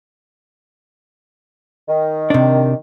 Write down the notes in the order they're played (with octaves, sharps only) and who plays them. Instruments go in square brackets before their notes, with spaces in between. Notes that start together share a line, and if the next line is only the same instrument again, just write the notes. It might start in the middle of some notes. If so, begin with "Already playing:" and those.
[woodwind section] D#3
[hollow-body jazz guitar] C3 D4